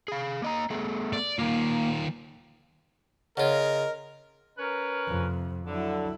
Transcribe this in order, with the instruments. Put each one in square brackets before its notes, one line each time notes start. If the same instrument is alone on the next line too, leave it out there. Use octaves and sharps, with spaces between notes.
[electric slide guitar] G#4 F5
A#3 D#5 A#5
A3 B3 G#4
[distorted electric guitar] D5
[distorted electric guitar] D#3 F4 [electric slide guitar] A#3
[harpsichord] C#3 F4 [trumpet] A#4 [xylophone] C#5 F#5 [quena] D#5
[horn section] C#4 A#4 B4
[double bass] F2 C3
[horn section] D3 [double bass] F#3 E4